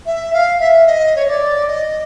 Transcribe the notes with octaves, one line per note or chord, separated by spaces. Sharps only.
E5
F5
E5
D#5
C#5
D5
D#5